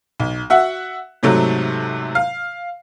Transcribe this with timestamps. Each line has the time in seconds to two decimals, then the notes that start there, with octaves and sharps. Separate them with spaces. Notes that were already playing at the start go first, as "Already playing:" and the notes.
0.20 B1
0.50 F#4 E5 F#5
1.23 G#2 C3 F#3 A3
2.15 F5